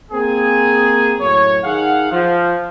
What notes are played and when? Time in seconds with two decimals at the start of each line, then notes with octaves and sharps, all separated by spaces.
0.12 A#3 C4 G#4
1.20 F#2 A2 C#5
1.63 D#3 G#4 F5 F#5
2.11 F3